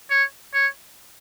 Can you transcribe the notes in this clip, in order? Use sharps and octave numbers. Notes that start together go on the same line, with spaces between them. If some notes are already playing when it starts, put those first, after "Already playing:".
C#5
C#5